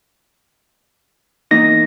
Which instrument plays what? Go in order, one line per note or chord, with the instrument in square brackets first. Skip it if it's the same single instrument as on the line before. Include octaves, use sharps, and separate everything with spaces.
[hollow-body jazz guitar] E2 A#3 D#4 [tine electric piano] A#6